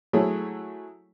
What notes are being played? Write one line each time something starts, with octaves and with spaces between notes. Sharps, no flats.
F#3 A3 E4 G#4 C#5